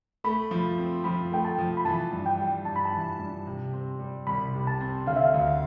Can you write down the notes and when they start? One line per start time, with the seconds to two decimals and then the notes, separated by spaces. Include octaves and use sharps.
0.24 A3 B5
0.51 F3
0.78 C4
1.04 F3 B5
1.31 A3 G5
1.45 A5
1.58 F3
1.77 B5
1.85 E3 A5
2.12 G2
2.26 G5
2.39 G3
2.65 G2 A5
2.76 B5
2.85 A5
2.92 E3
3.19 G2
3.46 C3
3.73 C4
3.99 G3
4.27 C2 B5
4.53 C3
4.67 A5
4.81 C4
5.06 D3 F5
5.16 E5
5.25 F5
5.34 D2